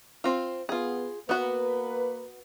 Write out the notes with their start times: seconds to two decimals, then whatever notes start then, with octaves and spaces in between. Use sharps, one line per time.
0.24 C4 F4
0.69 B3 F4 G#4
1.29 A#3 B3 F#4 B4